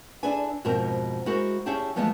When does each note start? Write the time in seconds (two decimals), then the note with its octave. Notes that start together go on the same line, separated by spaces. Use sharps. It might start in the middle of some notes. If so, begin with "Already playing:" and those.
0.23 D4 E4 G#4 A4 B4 G#5
0.65 F2 G#2 B2 C4 A#4
1.26 G#3 E4 F#4 A#4 C5
1.66 C#4 E4 G4 G#4 G5 A5
1.96 E3 F3 G#3 A3 B3 F4